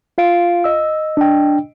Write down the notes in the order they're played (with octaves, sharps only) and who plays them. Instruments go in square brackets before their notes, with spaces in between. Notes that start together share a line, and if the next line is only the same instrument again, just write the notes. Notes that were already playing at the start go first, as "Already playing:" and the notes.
[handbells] F4 F5 D7
D#5 E6
[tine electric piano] D4 G5